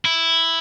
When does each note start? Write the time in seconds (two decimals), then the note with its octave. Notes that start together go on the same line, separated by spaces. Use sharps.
0.05 E4